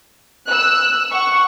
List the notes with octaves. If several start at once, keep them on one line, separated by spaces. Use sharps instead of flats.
E6 F#6
F#5 C#6